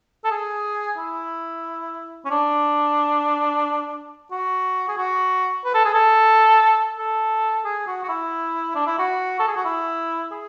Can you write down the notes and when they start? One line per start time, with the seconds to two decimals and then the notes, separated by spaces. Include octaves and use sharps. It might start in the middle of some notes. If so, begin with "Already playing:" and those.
0.24 A4
0.31 G#4
0.98 E4
2.25 C#4
2.30 D4
4.31 F#4
4.88 G#4
4.98 F#4
5.65 B4
5.74 A4
5.85 G#4
5.94 A4
6.98 A4
7.64 G#4
7.87 F#4
8.03 F#4
8.09 E4
8.75 D4
8.87 E4
8.99 F#4
9.39 A4
9.48 G#4
9.56 F#4
9.65 E4
10.32 G#4